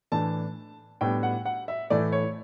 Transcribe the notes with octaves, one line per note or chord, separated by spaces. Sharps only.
A2 E3 A3 D4 A5
A2 G3 B3 D4 G5
F#5
F#5
E5
A2 E3 A3 D5
C#5